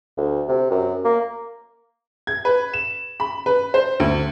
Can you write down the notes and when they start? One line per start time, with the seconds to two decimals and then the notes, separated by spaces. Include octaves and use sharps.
0.17 D2
0.48 C3
0.71 F#2
1.05 A#3
2.27 G#6
2.45 B4
2.74 E7
3.20 B5
3.46 B4
3.74 C5
4.00 D2